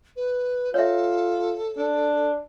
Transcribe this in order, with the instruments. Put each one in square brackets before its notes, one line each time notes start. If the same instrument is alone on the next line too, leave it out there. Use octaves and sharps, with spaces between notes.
[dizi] B4
[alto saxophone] F4 [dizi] A4 [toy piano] C#5 E5
[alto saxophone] D4